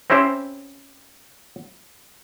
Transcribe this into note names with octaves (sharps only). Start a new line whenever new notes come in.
C4 C#4 E4 G4 C5